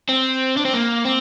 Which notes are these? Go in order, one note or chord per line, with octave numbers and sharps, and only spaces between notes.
C4
D4
C4
A#3
C4